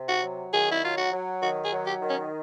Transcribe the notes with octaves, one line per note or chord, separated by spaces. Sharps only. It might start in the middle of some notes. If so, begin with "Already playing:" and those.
Already playing: C3
F#4
F#3
D#3 G#4
E4
F#3 F4
F#4
F#3
D#3 F#4
G#4
F#3
G4
D#3
C#4